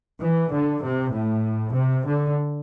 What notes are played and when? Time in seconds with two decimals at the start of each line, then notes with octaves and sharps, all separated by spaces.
0.21 E3
0.52 D3
0.82 C3
1.12 A2
1.74 C3
2.05 D3